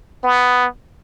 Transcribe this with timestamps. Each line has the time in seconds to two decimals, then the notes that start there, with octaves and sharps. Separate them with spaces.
0.24 B3